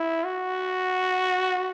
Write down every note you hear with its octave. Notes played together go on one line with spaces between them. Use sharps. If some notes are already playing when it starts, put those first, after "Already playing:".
Already playing: E4
F#4